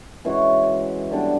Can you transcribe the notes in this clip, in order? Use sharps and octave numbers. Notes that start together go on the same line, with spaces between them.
E3 G#3 C#4 F#4
D3 G3 B3 D4